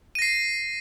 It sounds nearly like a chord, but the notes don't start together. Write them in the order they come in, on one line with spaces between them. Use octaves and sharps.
D#7 A#6 C7